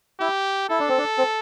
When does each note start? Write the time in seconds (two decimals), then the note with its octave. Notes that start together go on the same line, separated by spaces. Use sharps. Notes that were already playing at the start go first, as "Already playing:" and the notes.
0.21 E4 G4
0.69 E4 A4
0.79 D4
0.89 C4
0.98 D4
1.18 C4